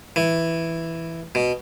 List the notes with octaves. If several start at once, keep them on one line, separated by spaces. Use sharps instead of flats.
E3
B2